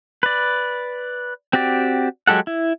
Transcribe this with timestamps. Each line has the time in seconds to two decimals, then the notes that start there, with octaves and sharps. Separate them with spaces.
0.23 B4 D5
1.53 C4 F#4 G4 D5
2.27 F#3 G#3 G4 A4 F#5
2.47 E4